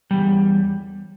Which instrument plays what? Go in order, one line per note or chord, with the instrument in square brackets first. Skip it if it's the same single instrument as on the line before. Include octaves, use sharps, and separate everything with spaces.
[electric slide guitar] E2 C3 G3